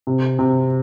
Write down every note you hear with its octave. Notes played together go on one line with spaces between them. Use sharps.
C3
C3